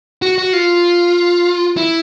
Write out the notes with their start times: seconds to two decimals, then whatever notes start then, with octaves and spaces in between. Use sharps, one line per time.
0.22 F#4
0.38 F#4
0.53 F4
1.77 E4